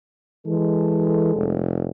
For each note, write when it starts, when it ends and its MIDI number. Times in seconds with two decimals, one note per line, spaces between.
0.46 1.34 52
0.46 1.62 56
0.46 1.62 69
1.36 1.88 29